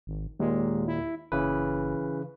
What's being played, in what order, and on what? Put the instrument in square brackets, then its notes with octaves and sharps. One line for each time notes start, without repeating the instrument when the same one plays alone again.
[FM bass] G#1
[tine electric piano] D#2 A#2 [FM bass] G#3
[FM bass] E4
[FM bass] F#1 [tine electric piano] C#3 E3 B4